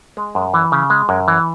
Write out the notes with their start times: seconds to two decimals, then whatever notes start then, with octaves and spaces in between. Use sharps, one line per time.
0.17 G#3
0.35 F#2
0.54 E3
0.72 C#3
0.90 G#3
1.09 F#2
1.28 E3